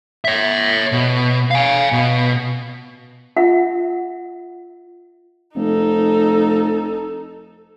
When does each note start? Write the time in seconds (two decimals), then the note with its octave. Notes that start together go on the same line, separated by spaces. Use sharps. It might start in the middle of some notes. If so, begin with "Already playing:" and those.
0.25 C#5 E5
0.92 B2
1.51 F5 G#5
1.92 B2
3.37 F4 E5 F#5
5.56 F1 D#4 A4